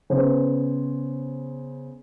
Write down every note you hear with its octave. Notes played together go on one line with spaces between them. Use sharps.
C#3 B3 C5